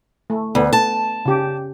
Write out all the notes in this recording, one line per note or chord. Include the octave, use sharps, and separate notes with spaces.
A3
D2 B3
A5
C#3 G4